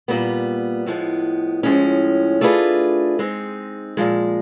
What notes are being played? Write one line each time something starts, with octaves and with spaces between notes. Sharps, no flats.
A#2 G3 B3
A2 F3 G#3 B3
A2 F3 G#3 C#4
A3 D4 F4 G#4 B4
G#3 C4 D#4
A#2 F3 G#3